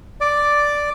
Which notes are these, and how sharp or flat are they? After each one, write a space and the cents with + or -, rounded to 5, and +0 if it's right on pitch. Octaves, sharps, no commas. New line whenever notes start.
D5 +0 D6 +0